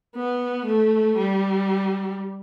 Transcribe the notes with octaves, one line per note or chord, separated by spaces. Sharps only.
B3
A3
G3